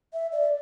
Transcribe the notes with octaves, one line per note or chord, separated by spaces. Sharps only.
E5
D5